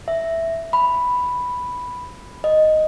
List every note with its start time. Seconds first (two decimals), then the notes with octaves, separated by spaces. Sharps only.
0.08 E5
0.73 B5
2.44 D#5